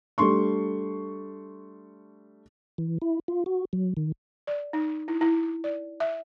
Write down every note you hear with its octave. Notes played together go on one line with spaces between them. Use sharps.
G3 A3 D4 C6 C#6
E3
E4
F4
F#4
F#3
D#3
D5
D#4
E4
E4
D5
E5